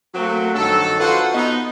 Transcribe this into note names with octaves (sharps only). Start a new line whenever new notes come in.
F#3 A3 A#3 C4 F#4
G2 D#3 F#3 A4
F4 F#4 A4 B4 C5 F#5
B3 D#4